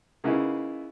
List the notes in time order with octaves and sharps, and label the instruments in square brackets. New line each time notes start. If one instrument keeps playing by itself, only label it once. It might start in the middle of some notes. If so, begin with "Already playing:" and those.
[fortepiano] C#3 A#3 B3 D#4 E4